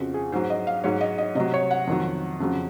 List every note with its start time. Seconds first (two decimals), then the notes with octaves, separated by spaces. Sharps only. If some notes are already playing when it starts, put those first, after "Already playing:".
Already playing: F2 C#3 F3 F#4
0.14 G#4
0.32 G#2 F#3 C5
0.50 D#5
0.67 F5
0.84 G#2 F#3 C#5
1.01 D#5
1.18 D#5
1.35 C3 F#3 D#5
1.54 C#5
1.71 F#5
1.87 F2 D#3 F#3
2.40 F2 C#3 F#3